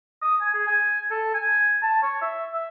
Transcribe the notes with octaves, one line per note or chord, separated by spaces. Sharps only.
D#6
G#5
G#4
G#5
A4
G#5
A5
C#5
E5
E5